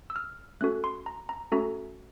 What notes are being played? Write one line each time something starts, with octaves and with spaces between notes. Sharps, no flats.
E6
F6
A3 C#4 F#4 A4 F#6
C6
A#5
A#5
A3 C#4 F#4 A4 A#5